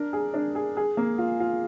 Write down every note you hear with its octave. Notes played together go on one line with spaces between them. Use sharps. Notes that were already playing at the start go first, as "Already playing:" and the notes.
Already playing: D4 A#4
G#4
D4
G#4
G#4
A#3
F4
F4